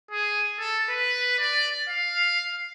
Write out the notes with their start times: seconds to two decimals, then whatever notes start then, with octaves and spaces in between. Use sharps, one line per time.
0.11 G#4
0.59 A4
0.89 B4
1.39 D5
1.89 F5